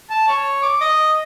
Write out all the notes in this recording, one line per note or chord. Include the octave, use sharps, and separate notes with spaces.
A5
C#5
D6
D#5